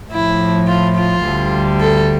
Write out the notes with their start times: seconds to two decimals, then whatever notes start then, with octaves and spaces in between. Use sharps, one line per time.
0.11 A2 F3 E4
0.67 F4
0.96 F4
1.25 D2 D3 G3
1.80 A4